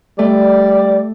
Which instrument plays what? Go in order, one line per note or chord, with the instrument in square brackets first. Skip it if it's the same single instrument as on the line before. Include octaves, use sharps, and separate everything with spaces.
[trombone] G3 [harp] A3 [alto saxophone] D5